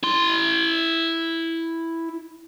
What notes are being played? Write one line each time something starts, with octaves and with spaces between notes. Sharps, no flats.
E4 C6